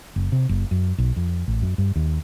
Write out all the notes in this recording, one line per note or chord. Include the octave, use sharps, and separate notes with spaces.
F#1
C3
F#1
F#2
B1
F2
A1
F#2
G2
D#2